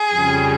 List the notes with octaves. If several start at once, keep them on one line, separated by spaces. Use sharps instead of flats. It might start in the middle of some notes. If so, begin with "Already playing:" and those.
Already playing: G#4
F2 C#3 G3